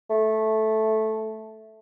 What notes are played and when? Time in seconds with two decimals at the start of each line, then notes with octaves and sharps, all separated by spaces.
0.10 A3